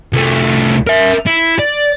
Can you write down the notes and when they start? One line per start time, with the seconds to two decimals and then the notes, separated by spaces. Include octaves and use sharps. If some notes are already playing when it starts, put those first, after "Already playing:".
0.13 C2 A3
0.87 A#4 E5
1.27 E4
1.59 D5